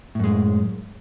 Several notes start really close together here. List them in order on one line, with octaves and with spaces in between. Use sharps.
A2 F#2 G#3